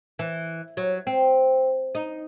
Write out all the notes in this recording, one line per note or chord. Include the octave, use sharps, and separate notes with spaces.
E3
F#3
C4
D#4